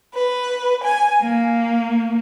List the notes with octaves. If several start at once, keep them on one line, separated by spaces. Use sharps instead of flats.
B4
G#5
A#3